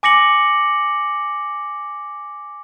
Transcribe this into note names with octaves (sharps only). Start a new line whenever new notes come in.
G#5 D6 A#6 C#7 F#7